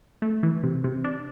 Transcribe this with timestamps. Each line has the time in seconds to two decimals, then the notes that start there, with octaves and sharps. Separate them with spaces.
0.22 A3
0.43 E3
0.63 C3
0.84 C3
1.04 D4